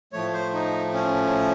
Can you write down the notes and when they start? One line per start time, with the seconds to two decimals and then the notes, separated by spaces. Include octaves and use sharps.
0.13 A2 F3 A3 C#5
0.33 C5
0.54 D#4
0.94 C#4